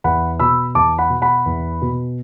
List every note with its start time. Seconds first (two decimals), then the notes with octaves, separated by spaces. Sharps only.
0.04 E2 F#5 B5
0.40 B2 B5 E6
0.75 E2 A5 D6
0.98 F#5 B5
1.10 B2
1.22 F#5 B5
1.46 E2
1.82 B2